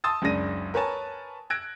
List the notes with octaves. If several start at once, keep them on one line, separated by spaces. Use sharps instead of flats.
A5 C6 D#6 E6 A6
F#1 C#2 C#3 D4 A#6 D#7
A#4 B4 C#5 G#5 A5
E6 F#6 G#6 A#6 D7